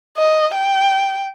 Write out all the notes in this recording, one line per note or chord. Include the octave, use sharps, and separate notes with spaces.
D#5
G5